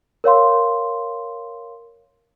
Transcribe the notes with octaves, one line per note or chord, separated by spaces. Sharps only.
A#4 C#5 F5 C6